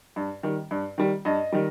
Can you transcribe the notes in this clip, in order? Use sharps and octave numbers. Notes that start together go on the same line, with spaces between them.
G2
D#3 G3
G2
D#3 G3
G2 D#5
D#3 G3